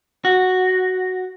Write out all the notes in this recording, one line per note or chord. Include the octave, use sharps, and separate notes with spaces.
F#4